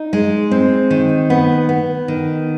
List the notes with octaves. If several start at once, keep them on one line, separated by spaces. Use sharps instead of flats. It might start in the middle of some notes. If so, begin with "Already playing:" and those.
Already playing: D#4
G#3
C4
D#3
B3
B3
D#3